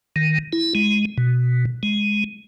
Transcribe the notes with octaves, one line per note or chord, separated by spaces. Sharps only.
D#3
E4
G#3
B2
G#3